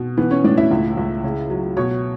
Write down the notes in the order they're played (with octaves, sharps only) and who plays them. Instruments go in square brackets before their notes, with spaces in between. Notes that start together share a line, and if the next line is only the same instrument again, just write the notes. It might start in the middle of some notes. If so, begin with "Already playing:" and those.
Already playing: [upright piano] B2
E3 B3 B4
C#4 C#5
A2 D4 D5
E4 E5
C#2
C#2
C#3
F#3
B2 C#5 C#6